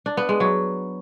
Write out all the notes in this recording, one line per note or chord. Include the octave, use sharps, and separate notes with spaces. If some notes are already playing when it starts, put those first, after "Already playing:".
D4
B3
G#3
F#3